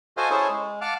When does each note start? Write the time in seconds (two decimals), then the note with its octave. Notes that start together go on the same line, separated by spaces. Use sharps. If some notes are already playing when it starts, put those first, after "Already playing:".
0.17 F#4 A4 C5 D#5 F5 G#5
0.30 C#4 E4 G#4 A4 C5 C#5
0.49 G#3
0.81 F5 F#5 A5 D6 F6